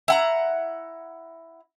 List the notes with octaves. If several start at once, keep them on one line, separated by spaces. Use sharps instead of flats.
E4 F#5 A#5